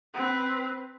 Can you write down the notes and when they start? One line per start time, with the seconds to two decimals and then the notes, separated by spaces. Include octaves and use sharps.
0.14 C4 B4